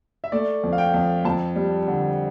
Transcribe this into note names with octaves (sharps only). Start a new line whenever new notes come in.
E5
A3 D5
F2
F5
G5
F2
F2 A5
G3
D3